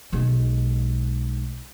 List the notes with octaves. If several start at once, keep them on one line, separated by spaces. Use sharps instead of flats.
B1 G#3